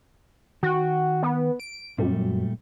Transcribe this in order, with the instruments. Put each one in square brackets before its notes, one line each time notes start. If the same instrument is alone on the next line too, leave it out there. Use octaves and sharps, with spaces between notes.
[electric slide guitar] D#3 G5 [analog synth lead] F#4
[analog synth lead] B3
D7
[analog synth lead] F#2 [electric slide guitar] A#2 G3 A3